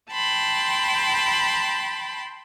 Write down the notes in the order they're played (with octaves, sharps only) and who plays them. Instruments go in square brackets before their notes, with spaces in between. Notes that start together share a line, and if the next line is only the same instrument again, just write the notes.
[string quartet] G5 A5 B5 C6